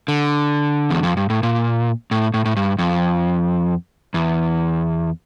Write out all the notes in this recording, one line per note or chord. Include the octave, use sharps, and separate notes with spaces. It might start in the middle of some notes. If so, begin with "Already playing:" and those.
D3
E2
F2
G2
A2
A#2
A2
A2
A2
G2
F2
E2